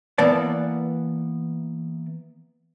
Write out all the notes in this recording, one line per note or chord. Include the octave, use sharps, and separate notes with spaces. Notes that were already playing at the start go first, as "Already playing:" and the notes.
E3 A#3 B3 D5 A5